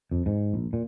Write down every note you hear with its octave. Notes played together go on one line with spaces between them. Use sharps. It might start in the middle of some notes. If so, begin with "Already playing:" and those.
F2
G#2
A#1
A#2